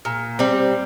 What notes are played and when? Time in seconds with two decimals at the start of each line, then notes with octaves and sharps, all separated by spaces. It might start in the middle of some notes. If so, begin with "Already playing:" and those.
0.05 A#2
0.39 G3 C4